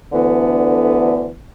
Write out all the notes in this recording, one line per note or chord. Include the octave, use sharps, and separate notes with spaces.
D2 D3 E3 B3